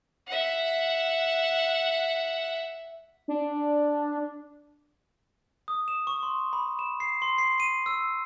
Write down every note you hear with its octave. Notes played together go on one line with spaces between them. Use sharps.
E5 F#5
D4
D#6
E7
C#6
C6
B5
E7
C7
C6
C7
D#7
E6